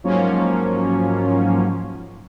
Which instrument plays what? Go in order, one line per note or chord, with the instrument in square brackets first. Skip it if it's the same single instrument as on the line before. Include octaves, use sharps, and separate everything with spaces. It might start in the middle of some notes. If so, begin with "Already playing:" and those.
[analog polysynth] G#2 F3 F#3 A#3 C#4 F4